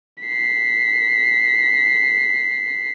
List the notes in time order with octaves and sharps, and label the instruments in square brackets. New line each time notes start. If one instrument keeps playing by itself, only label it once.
[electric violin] B6 C7